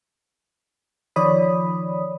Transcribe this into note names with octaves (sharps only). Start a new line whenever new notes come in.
D#3 F3 C#5 D5 B5 D#6